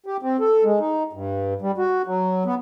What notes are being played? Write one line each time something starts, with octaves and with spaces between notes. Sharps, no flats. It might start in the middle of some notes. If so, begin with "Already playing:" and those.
G4
C4
A4
G#3
D#4
G2
G3
F#4
F#3
B3